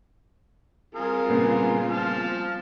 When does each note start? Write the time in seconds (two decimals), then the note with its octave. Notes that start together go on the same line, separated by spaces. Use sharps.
0.95 G3 C4 F4 G#4 A#4
1.29 A#2 C#3 B3
1.90 F3 A5 F6